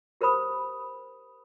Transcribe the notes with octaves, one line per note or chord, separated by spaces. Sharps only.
G4 A#4 C5 B5 D#6